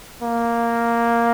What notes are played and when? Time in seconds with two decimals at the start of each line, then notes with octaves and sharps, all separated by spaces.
0.22 A#3